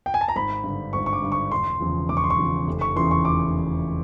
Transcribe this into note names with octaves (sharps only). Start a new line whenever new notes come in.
G5
G#5
A5
A#5
G#1 B5
G2 D3
G#1 C#6
C#6
D6
G2 D3
C#6
E1 C6
E2 C#3 F3
E1 D6
C#6
C6
C#6
E2 C#3 F3
F1
C#6
E2 C#3 E3 C6
C#6
F1 D6